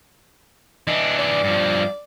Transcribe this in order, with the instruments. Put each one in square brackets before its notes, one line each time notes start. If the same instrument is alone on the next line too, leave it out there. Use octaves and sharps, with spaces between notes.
[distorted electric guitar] E3 D4 [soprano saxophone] D#5
[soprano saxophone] D5
[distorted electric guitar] G2 F3